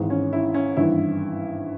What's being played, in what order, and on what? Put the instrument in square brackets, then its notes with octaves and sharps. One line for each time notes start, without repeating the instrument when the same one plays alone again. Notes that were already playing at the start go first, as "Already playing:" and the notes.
Already playing: [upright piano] G#1 G#2 E3
C#4
E4
C#4
G#1 G2 E3 E4